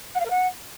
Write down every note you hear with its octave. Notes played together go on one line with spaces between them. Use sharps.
F#5
F5
A#4
F#5